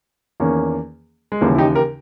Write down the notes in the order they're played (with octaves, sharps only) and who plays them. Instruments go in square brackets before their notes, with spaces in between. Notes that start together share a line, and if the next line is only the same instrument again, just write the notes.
[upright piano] E2 D#3 A#3 C#4
[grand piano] G#3
[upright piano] D#2 C#3 E3 [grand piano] G3 A#3
[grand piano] E4
D#4 G4
G4 A#4